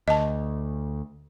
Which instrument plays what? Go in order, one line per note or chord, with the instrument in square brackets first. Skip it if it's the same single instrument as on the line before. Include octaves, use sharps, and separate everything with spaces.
[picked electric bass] D2 [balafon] D#5 A5